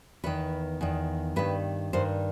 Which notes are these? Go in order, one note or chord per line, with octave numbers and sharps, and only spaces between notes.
E2 D#3 B4
E2 D#3
G2 D#3 B4
G2 D#3 C5